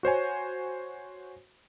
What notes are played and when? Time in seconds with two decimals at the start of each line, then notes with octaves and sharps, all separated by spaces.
0.03 F#4 C5 C#5 G#5